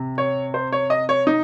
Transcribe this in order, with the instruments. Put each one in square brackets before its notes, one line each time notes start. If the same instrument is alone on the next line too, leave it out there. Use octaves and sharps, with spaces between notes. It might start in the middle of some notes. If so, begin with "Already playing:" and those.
Already playing: [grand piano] C3
[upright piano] C#5
C5
C#5
D#5
C#5
D#4